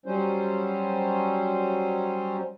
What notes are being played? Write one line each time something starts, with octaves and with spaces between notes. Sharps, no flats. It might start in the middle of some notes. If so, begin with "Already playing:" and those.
F#3 G3 C#4 C5